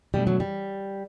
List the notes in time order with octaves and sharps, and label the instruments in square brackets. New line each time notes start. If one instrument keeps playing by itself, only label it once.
[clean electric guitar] B1 B2 A3 D4 [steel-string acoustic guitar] G3
[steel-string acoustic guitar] F#3
G3